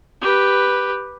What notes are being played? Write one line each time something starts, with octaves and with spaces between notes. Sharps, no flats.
G4 B4